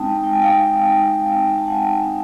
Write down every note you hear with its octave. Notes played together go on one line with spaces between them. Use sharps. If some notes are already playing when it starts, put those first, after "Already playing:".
Already playing: G#3 C4 D#4 G5 A5
G#3 G5
G#5
F5 G5
C4 D#4
G#3
C4 D#4
A5
G#3 F#5 G#5
C4 D#4